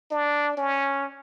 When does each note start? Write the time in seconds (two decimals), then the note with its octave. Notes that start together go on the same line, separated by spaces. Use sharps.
0.11 D4
0.57 C#4